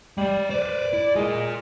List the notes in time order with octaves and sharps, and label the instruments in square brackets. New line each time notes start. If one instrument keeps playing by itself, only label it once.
[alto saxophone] G3 [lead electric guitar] G#3 D5
[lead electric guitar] B4 C5 [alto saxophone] D5
[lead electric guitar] E4
[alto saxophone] G#3 [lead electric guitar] F4 A#4